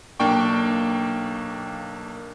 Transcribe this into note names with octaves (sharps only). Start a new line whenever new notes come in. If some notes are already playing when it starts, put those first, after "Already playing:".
B1 A#3 D4 G5 C#6